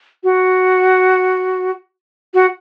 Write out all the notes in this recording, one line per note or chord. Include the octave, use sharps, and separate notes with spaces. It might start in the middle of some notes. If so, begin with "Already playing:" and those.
F#4
F#4